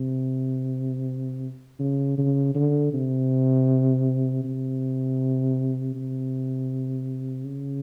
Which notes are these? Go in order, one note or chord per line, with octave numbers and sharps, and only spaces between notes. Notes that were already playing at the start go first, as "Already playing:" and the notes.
Already playing: C3
C#3
C#3
D3
C3
C3
C3
C#3